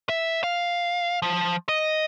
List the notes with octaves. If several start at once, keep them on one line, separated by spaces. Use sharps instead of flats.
E5
F5
F3
D#5